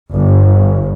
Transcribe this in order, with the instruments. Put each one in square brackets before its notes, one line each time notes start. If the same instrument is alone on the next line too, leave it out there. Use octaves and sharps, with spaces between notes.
[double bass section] G1